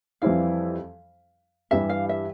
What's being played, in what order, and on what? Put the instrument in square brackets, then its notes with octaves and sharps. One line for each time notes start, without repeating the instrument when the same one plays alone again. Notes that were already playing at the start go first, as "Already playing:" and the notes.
[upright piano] F2 E3 G3 C4 E4 [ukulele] F5
[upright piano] G2 E3 G3 [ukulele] E5
[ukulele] F5
E5